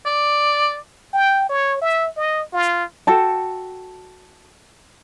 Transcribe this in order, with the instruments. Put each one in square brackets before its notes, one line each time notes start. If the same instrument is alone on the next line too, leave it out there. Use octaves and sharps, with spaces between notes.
[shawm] D5
[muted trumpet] G5
C#5
E5
D#5
F4
[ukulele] F#4 A4 G5 A5